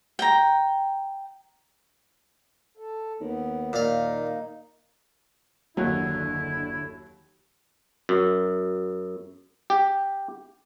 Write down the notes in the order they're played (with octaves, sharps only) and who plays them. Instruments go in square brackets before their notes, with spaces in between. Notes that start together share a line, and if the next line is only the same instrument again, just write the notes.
[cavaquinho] G5 A#5
[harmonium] A4
[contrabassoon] D#2 [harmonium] B3
[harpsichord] A#2 F5 [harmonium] A#3 D#4
[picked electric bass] F#1 A#3 [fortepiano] D#2 F#3 [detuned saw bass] D3 [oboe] E4
[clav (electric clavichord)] F#2
G4